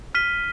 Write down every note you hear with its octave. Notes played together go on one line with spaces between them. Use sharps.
F6 B6 D#7 G7